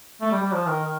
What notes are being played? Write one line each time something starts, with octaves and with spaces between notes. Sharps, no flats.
A3
G3
G3
F3
D#3
D#3